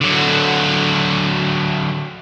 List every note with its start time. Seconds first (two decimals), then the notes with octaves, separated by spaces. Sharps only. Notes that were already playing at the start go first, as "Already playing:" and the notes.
0.01 D3 F#3